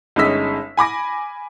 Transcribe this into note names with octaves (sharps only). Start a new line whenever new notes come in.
G1 G#3 C#4 D#4 E6 B6
G#5 B5 D6 A#6